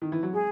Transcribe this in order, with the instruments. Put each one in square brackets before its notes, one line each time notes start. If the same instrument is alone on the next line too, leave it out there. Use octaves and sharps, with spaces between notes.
[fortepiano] D#3
E3
F#3
[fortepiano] G#3 [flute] G#4